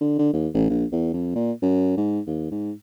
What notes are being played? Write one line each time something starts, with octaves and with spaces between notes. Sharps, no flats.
D3
D3
D#2
A1
A#1
E2
F2
A#2
F#2
G#2
D#2
G#2